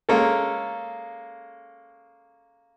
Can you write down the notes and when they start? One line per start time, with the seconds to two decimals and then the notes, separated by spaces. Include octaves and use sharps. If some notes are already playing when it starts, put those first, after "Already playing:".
0.09 G#3 A#3 C#4 A4